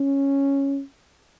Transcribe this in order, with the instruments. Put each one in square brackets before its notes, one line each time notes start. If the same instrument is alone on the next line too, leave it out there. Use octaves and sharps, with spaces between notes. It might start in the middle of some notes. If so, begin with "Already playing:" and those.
Already playing: [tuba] C#4